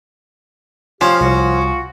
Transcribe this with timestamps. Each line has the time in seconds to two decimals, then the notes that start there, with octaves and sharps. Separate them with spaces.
1.01 F3 C#4 G4 F5
1.21 C2 F4 F#4